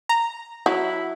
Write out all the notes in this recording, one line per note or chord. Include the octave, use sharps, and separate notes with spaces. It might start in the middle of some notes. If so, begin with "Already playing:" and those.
A#5
F#3 E4